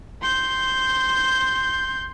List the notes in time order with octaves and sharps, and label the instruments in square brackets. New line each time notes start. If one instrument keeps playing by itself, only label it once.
[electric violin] C6 G6